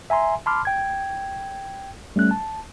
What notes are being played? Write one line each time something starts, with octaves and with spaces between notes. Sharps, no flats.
E5 G#5 A#5 C6
A5 B5 C6 D6 F6
G5 G#6
G3 A3 C#4 F#6
A5